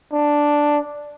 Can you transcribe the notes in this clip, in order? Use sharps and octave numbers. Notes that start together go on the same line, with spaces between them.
D4